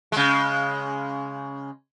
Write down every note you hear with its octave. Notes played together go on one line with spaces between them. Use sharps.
C#3 G#3